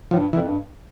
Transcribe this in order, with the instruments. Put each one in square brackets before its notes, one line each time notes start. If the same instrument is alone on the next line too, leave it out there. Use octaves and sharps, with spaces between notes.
[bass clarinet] A2 [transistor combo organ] F3
[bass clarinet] G2
[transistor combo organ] E3
[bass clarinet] F2
G2